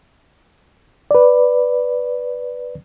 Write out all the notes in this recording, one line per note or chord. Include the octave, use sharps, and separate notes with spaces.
B4 D5